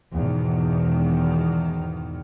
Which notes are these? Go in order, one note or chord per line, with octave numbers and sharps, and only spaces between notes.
E2 G#2 B2 D#3